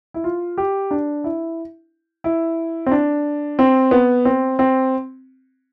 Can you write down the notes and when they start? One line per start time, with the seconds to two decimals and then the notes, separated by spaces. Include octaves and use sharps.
0.14 E4
0.24 F4
0.58 G4
0.91 D4
1.24 E4
2.24 E4
2.86 C4
2.91 D4
3.59 C4
3.91 B3
4.25 C4
4.59 C4